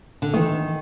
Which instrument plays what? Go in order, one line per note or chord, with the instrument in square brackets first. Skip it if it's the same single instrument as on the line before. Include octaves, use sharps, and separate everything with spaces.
[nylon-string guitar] D3
[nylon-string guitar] D#3 [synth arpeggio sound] E3 A3